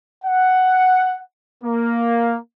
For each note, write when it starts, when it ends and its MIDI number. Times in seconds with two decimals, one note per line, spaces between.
0.25 1.21 78
1.64 2.38 58